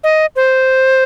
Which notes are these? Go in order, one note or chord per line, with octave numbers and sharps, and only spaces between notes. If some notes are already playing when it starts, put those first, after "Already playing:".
D#5
C5